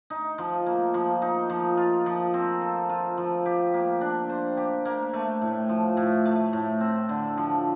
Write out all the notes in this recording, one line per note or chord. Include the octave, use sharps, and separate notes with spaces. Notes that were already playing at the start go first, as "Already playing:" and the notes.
D#4
F3
A#3
F3
D#4
F3
F4
F3
C4
A4
F4
F3
G4
A#3
D4
C5
G4
A#3
A3
A2
F3
A2
A3
A2
C4
D3
F3